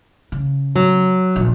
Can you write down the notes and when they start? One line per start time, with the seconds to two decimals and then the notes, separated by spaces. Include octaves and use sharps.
0.32 C#3
0.75 F#3
1.36 A#1 F3